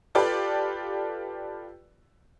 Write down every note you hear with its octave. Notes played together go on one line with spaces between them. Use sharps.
F4 G4 A4 B4 D5